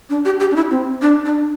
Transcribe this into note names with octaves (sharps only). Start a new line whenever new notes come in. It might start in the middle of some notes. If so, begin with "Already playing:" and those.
D4
G4
G4
D4
E4
C4
D4
D4